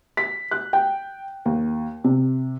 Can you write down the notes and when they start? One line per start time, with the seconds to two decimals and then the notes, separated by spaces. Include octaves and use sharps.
0.17 B6
0.51 F#6
0.73 G5
1.45 D#2
2.04 C3